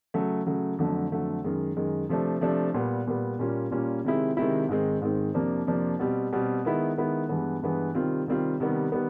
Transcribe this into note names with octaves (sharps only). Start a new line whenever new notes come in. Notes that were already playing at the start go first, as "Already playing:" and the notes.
C#3 F#3 A3
C#3 F#3 A3
F2 D3 F#3 A3
F2 D3 F#3 A3
F#2 D#3 G#3
F#2 D#3 G#3
C3 F3 A3 D4
C3 F3 A3 D4
A#2 G3 B3
A#2 G3 B3
A#2 G3 A#3 C#4 F4
A#2 G3 A#3 C#4 F4
C3 D#3 G#3 C4 E4
C3 D#3 G#3 C4 E4
G#2 D#3 G#3 C4
G#2 D#3 G#3 C4
F2 C3 F3 A#3 D4
F2 C3 F3 A#3 D4
B2 G3 C4
B2 G3 C4
D#3 G#3 B3 E4
D#3 G#3 B3 E4
G2 E3 G#3 B3
G2 E3 G#3 B3
C3 D#3 G3 C4 F4
C3 D#3 G3 C4 F4
C3 D#3 G3 B3
D#3 G3 B3